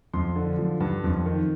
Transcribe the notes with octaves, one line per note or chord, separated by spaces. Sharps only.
F2 C6
D3
F3
G2
F2
D#3